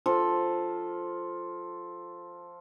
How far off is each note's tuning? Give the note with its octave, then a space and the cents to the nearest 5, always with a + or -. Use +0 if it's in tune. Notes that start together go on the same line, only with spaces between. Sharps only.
F3 +0 A4 +0